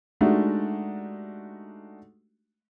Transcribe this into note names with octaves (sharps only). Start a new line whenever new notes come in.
G#3 A3 D4 D#4 F#4 G4